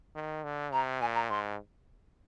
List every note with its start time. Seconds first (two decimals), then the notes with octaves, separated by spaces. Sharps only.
0.15 D#3
0.44 D3
0.73 C3 A#5
1.01 A#2 G#5
1.15 A#5
1.30 G#2 C6